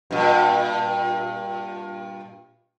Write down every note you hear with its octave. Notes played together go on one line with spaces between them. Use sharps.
G2 A#2